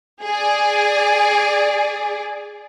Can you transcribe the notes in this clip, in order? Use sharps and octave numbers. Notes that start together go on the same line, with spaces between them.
G#4 D5